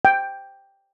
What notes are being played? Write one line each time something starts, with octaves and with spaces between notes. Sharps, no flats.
G5